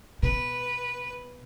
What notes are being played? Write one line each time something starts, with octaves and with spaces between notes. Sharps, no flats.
B2 B4